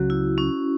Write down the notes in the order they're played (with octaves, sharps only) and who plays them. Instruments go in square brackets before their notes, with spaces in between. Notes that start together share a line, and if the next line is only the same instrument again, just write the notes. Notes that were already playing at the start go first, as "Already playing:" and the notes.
Already playing: [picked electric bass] C#2 C#3 F#3 [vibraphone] F#4
[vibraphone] E4
C#4